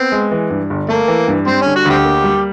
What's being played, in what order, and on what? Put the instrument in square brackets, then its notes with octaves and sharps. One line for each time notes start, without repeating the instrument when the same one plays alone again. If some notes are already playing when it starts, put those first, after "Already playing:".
Already playing: [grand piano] B3 [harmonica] C4
[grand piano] G#3
E3
G2
G1
[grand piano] A3 [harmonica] A#3
[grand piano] E3
G2
[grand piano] G3 [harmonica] C4
[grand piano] D3 [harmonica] C#4
[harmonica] F#4
[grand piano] D2 [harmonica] C4 G4
[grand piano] A#3
G3